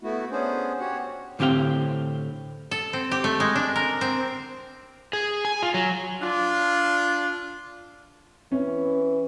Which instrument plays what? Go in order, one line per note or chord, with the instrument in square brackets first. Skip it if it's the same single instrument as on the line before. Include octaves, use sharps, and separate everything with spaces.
[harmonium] A3 B3 E4 F#4
B3 C#4 D4 G#4 C5
F#4 G4 C#5 F#5
[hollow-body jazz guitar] A2 D3 C4 G4 F5 G5
[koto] A4
C4
G4
A3
G#3
D4
A#4
C4
[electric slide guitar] G#4
G#5
F4
F#3
[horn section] D4 F4
[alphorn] E3 [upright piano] C#4